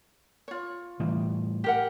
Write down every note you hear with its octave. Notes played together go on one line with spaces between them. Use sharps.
F4 C#5
A2 E3 G3
G4 A#4 F#5